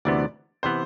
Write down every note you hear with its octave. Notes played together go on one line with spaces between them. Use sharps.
D2 C3 E3 B3 D5
C3 E3 B3 C5